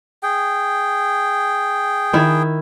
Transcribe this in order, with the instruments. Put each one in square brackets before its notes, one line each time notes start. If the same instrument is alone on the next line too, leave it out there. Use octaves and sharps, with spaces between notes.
[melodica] G#4 G5
[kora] D#3 E4